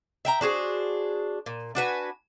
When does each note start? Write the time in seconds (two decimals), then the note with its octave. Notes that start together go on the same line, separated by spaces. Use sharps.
0.25 E5 G5 A#5
0.41 D4 F#4 G#4 C5
1.46 A#2
1.75 D4 F#4 B4 G#5